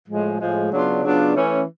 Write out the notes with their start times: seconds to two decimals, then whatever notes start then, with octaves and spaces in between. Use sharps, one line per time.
0.08 A2 F3 G#3
0.40 A2 F3 G#3
0.71 C#3 F#3 B3 D4 F4
1.03 C#3 F#3 B3 D4 F4
1.34 E3 A3 C#4